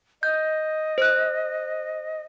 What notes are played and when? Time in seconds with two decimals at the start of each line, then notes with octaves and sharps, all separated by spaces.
0.23 D#5 G6
0.98 C5 F#6